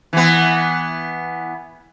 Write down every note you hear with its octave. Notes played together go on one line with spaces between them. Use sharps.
E3 B3